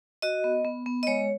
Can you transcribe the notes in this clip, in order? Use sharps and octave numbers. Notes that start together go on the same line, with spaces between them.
F#4 D#5
B3
B3
B3
D#5
G#3 C#5